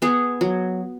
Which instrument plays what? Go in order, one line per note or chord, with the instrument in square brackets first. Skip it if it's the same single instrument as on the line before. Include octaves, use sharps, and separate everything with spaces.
[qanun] B3 G#4
F#3